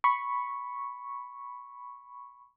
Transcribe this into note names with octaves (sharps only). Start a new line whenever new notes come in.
B5 C#6